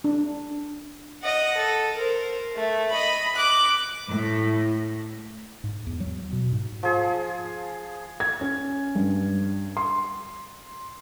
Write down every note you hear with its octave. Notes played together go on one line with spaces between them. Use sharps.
D4
D#5 F#5
A4
A#4 C5
A3
D#5 B5
D6 F#6
A2
G#2
E2
F#3
B2
G#2
F3 G#4
G#6
C#4
G2
C6